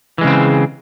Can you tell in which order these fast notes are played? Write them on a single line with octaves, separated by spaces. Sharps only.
E3 G#3 C#3 C4